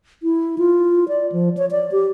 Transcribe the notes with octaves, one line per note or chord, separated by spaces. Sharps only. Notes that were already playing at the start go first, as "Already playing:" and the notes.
E4
F4
D5
F3
C#5
D5
G4